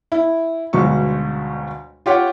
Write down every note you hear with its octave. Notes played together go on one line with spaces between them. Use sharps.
E4
G1 D2 G#2 B2 C#6
F4 G4 C#5 F#5